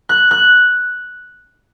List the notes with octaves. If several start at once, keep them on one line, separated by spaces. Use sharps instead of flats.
F#6
F#6